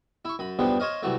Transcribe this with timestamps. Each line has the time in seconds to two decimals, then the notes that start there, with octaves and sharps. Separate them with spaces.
0.25 E4 C#6
0.39 F#2 B5
0.59 E2 G2 F3 G3 B3
0.80 C5 C#5 D#5 F5
1.02 C2 E3 F#3 A3